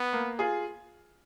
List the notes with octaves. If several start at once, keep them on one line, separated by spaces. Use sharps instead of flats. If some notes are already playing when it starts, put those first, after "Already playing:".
Already playing: B3
A#3
F4 G#4